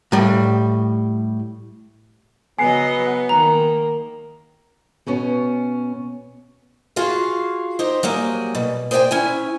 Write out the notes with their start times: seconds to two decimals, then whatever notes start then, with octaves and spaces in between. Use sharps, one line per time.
0.12 A2 G3
2.59 C#3 F#3 B3 D#5 G#5 C7
3.29 D#3 A#3 A#5
5.07 B2 B3 C#4
6.96 F4 F#4 G#4 F5
7.79 D#4 G4 C5
8.03 F#3 G3 A#3 G#4
8.55 B2
8.91 G#4 C5 D5 D#5 G5 G#5
9.11 C#4 E4 G#5